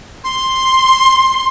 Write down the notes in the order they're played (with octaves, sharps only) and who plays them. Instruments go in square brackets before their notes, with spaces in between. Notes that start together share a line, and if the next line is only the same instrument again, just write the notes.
[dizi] C6